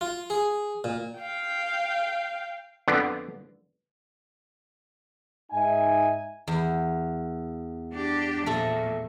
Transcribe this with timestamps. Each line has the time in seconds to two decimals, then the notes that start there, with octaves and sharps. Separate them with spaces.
0.01 F4
0.30 G#4
0.84 A#2
1.19 F5 G5
2.88 F2 D3 B3 D5
5.52 G#2 D#4 D#5 E5 G#5
6.48 E2
7.94 D4 G4
8.46 A#2 F3 A3 A4